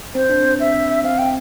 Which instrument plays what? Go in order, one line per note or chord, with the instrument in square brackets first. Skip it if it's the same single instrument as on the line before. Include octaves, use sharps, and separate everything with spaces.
[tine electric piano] C4 [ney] C5
[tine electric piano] D4
C4
[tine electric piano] C4 [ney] E5
[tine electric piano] C4 [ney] F5
[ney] G5